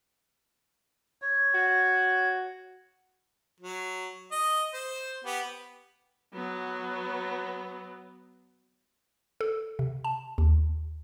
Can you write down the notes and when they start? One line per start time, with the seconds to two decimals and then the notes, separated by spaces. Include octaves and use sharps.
1.22 C#5
1.54 F#4
3.60 F#3
4.32 D#5
4.74 C5
5.25 B3 G4
6.34 F#3 B3
9.41 A4
9.79 C3
10.04 A5
10.38 D#2